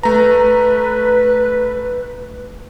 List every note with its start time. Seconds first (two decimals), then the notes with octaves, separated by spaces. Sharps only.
0.03 A3 B4 A#5